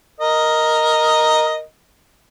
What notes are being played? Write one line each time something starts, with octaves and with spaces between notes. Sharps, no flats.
A#4 D#5